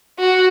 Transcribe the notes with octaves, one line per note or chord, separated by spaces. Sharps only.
F#4